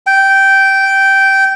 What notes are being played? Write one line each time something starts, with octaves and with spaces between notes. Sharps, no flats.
G5